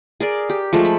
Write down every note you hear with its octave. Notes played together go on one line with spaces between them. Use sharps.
G#4 A#4 D5
G4
F3 G#3 A3
B5